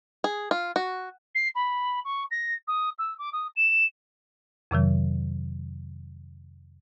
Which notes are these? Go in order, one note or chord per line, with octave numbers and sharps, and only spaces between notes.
G#4
F4
F#4
C7
B5
C#6
A#6
D#6
E6
D6
D#6
E7
F2 C3 D#3 F#3